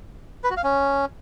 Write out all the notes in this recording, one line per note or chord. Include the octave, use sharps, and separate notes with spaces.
B4
F#4
F5
C#4